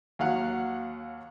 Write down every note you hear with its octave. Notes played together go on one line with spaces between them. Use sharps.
D#2 F#3 F5 F#5